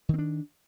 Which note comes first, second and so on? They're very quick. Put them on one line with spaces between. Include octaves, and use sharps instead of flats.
D#3 C4 D4